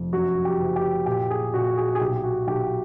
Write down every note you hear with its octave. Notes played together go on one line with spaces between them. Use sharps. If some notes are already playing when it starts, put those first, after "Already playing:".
Already playing: F1 F2
F#2 F#4
G4
F#1
G4
A#2 G4
G#4
A#2 F#4
G#4
G#4
B1 G4
F#4
B1 G4